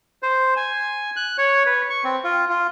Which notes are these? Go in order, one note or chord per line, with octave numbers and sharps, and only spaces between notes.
C5
G#5
F#6
C#5
B4
C#6
C4
F4
F4